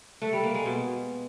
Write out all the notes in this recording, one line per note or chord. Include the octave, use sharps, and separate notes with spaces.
A3
G3
A#3
G#3
B2